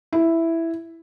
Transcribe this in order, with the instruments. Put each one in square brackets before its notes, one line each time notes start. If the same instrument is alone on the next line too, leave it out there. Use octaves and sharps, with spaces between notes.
[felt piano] E4